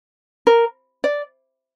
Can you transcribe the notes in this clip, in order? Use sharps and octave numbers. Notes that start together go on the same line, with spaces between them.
A#4
D5